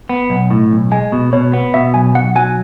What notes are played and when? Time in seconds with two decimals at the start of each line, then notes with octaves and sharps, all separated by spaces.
0.09 B3
0.30 B1
0.51 A2
0.71 B1
0.92 G#3 G#5
1.12 B2
1.33 B2 C#5
1.53 B3
1.74 B2 E5
1.94 B1 G#5
2.15 B1 F#5
2.36 F#3 G#5